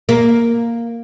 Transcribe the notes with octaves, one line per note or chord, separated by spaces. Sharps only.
A#3